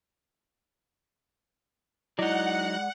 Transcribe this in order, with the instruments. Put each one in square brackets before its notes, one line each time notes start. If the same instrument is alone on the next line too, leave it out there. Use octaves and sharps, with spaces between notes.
[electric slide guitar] F#3 D#4 [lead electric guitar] G#3 D5 [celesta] E4 D#5 [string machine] F#5